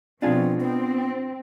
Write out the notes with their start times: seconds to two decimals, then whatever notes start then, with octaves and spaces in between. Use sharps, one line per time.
0.22 B2 F3 C4 D4 F4 G#4
0.61 B3 C4